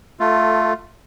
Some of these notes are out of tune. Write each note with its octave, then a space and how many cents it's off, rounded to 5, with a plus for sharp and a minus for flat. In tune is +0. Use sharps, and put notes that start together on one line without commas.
A3 +0 F4 +5 A4 +15